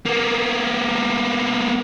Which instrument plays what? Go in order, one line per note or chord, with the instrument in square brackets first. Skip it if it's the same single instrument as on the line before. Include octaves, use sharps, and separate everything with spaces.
[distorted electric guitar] A#3 B3